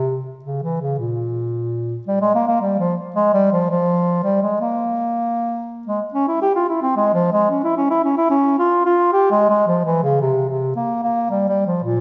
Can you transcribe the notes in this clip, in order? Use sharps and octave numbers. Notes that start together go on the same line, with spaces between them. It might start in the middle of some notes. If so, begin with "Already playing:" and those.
Already playing: C3
C#3
E3
C#3
A#2
G3
G#3
A#3
A#3
G3
F3
G#3
G3
F3
F3
G3
G#3
A#3
G#3
C#4
E4
G4
F4
E4
C4
G#3
F3
G#3
C#4
E4
C#4
E4
C#4
E4
C#4
F4
F4
G4
G#3
G#3
F3
E3
C#3
C3
C3
A#3
A#3
G3
G3
F3
A#2